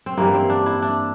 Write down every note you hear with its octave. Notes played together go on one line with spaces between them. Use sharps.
C4
G2 E3 G3 A#3
C4
D4
E4
D4